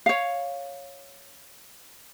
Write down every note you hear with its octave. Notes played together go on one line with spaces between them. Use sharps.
C#5 F5